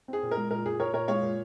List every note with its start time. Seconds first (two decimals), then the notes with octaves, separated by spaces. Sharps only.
0.08 C4 G#4
0.23 A#2
0.31 A#4
0.37 G#3
0.51 A#2 A#4
0.66 A#2 G#4
0.80 A#2 A#4 C#5
0.94 A#2 A#4 C#5
1.08 G#3 C#5 F5
1.23 A#2